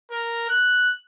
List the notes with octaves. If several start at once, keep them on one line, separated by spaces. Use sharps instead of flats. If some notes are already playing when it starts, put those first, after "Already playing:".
A#4
F#6